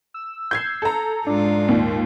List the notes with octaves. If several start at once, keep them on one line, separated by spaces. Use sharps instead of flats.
E6
G6 G#6 C7
A4 A#5
G#2 G#3 D4 F4
D#2 A#2